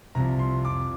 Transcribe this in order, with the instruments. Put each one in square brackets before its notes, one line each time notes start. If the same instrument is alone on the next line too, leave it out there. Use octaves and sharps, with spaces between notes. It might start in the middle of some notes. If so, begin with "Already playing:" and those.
[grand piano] C2 C3 F3 A#5
C6
F2 F3 D6